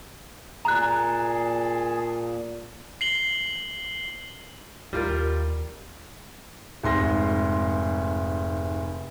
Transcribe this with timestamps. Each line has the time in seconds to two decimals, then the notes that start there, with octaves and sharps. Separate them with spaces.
0.65 A#2 G#4 A5 A#5 F#6
3.01 C7 F#7 G7
4.93 D#2 G3 F4 A#4
6.83 F1 G#2 C6 A#6